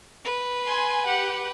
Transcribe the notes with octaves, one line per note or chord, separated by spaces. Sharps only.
B4
G#5 C6
G4 F#5